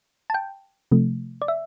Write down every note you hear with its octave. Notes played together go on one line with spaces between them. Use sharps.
A5
G5
C3 F3 A3
D5
E5